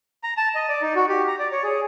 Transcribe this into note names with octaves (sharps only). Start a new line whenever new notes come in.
A#5
A5
D#5
D5
D#4
F#4
G4
A#5
D5
C#5
G#4